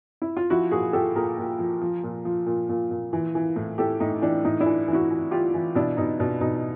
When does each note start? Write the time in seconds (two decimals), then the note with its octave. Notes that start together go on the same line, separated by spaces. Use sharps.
0.22 E4
0.37 F4
0.50 F3 E4 F#4
0.71 A#2 F#4 G#4
0.93 F3 G4 A4
1.15 A#2 G#4 A#4
1.38 A#2
1.59 F3
1.81 F3
2.04 A#2
2.25 F3
2.47 A#2
2.69 A#2
2.91 A#2
3.13 E3
3.35 E3
3.56 A2
3.78 A2 G4 A4
4.00 A2 D#4
4.22 E3 D4
4.45 A2 D#4
4.60 D4 E4
4.66 E3
4.88 E3
4.93 E4 F#4
5.11 E3
5.31 E3 F4 G4
5.54 E3
5.75 B2 D4 E4
5.97 B2 D#4
6.19 B2 D4
6.41 B2 D#4